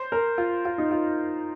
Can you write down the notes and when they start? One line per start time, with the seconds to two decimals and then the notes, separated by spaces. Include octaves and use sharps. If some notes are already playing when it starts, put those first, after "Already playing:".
Already playing: C5
0.12 A#4
0.38 F4
0.65 F4
0.78 D#4
0.91 F4